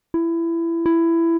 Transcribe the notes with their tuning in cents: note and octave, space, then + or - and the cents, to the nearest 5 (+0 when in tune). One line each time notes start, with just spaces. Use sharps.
E4 +20
E4 +15